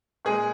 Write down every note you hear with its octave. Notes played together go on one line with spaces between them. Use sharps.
A#2 G#3 G#4